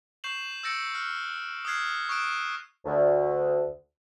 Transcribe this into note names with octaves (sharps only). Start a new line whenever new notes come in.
C#6 G6 C7 E7 F#7
E6 G6 A6 A#6 C#7 D7
F6 F#6
D#6 F6 F#6 G#6 C7
C#6 D#6 F#6 D7 E7
D2